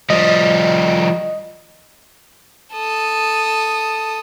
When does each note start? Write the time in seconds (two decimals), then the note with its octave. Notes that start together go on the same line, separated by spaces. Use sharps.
0.10 F3 G3 D#5
2.73 A4 D#6